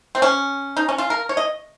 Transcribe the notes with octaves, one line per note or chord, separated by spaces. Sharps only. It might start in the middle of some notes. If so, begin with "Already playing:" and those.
C4
C#4
D#4
C#4
F4
A#4
C#5
D#5